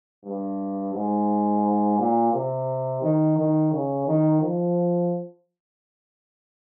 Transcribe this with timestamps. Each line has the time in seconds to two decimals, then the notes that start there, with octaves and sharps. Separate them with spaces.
0.25 G2
0.94 G#2
1.99 A#2
2.33 C3
3.02 D#3
3.37 D#3
3.72 C#3
4.07 D#3
4.42 F3